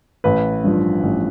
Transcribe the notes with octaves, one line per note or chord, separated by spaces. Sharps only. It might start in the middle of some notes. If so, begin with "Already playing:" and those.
A1 B4
G2 F3
A1